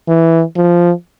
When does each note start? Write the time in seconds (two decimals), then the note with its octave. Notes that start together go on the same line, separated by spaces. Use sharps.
0.08 E3
0.57 F3